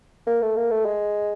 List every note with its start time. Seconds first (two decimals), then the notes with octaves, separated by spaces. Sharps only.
0.27 A#3
0.42 A3
0.56 A#3
0.71 A3
0.85 G#3